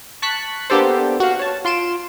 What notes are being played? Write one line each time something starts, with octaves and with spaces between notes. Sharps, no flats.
A5 C#6 F#6 B6
A#3 B3 D4 G4 A4 C5
F#4 F5
C#5 A5
F4 C6 D7 E7